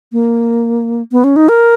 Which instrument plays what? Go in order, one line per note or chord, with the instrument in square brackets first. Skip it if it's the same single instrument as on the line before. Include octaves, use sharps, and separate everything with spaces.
[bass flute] A#3
B3
C#4
D#4
A#4